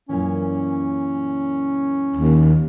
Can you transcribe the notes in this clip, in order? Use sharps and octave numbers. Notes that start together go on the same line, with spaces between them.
F#2 A#2 E3 C#4
D#2